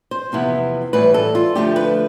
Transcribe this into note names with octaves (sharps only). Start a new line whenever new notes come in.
C5
E2 C3 F3 B3 E4
A2 E3 G3 B4
A4
F4
D3 F3 A3 G4
B4